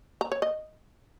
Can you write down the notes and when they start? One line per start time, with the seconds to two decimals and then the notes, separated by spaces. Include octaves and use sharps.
0.21 A#5
0.32 C#5
0.42 D#5